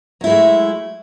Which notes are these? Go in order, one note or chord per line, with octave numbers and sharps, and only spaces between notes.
F#3 G#3 A3 E4